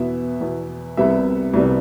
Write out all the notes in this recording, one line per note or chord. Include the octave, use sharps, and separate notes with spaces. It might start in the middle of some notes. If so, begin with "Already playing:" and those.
Already playing: E2 B2 B3 E5
E2 B2 B3
C2 C3 G3 B3 E5
C2 C3 G3 B3